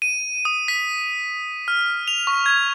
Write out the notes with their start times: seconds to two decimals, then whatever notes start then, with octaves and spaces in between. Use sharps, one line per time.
0.02 D#7
0.45 D#6
0.68 B6
1.68 F6
2.08 F7
2.27 C#6
2.46 G#6